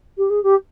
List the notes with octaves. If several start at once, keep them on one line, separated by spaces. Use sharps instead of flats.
G4
G#4
G4